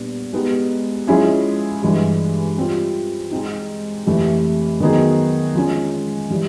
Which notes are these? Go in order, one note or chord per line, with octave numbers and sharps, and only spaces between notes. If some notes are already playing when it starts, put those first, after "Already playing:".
Already playing: A#2 G3 B3 D4
G#3 B3 D#4 G4
F3 G#3 C#4 E4 G#4
G2 E3 G#3
G3 C4 F4
G#3 C4 D#4
F2 C3 E3 A3
D#3 F#3 B3 D#4 G#4
F3 G#3 C#4
E3 G3